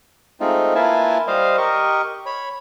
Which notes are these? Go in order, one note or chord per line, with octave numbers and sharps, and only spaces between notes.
G#3 A3 C4 D#4 F4
A#3 E4 F4 B4 G#5 A5
G3 C5 D#5 F5
G4 A#4 D#5 C#6
C#5 B5